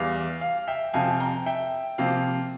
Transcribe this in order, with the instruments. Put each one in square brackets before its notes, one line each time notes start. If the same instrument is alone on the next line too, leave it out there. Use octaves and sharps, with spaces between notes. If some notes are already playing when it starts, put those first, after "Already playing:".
Already playing: [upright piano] E2 E3 G3 F5
F5
E5 G5
F2 C3 F3 F5 G#5
G5 A#5
E5 G5
C3 F3 A#3 F5